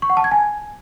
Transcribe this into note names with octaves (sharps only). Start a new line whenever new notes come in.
C#6
F#5
A5
G#6
G#5